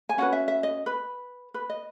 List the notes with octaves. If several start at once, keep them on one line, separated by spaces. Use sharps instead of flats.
G#5
C#4 F#4 B4 F#5
E5
E5
D#5
B4
B4
D#5